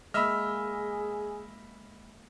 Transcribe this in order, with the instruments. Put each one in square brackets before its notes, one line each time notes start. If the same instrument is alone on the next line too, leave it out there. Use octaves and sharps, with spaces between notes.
[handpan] G#3 A#3 [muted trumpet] G#4 [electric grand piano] D#5 E5 [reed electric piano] B5 E6 F6